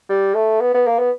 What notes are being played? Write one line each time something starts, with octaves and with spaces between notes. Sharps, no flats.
G3
A3
B3
B3
A#3
B3